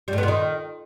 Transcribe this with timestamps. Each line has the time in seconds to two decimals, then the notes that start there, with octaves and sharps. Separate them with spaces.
0.08 G3
0.13 A2
0.18 B3
0.23 A#2
0.28 D#3